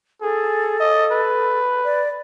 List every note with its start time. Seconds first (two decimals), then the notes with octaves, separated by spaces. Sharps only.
0.22 G#4 A4
0.80 D#5
1.12 B4
1.85 D5